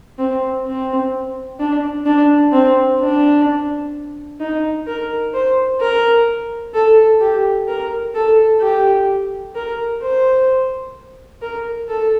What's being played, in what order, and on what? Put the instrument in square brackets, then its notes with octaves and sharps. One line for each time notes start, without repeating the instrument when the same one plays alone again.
[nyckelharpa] C4
C4
D4
D4
C4
D4
D#4
A#4
C5
A#4
A4
G4
A#4
A4
G4
A#4
C5
A#4
A4